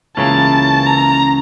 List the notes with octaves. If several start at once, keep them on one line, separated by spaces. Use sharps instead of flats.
C#2 C#3 E3 A#3 C#4 A5
A#5